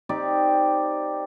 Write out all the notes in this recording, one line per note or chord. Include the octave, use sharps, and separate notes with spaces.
C4 D#4 G4 D5